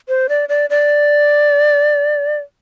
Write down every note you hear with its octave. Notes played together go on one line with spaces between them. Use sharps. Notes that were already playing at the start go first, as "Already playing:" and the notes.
C5
D5
D5
D5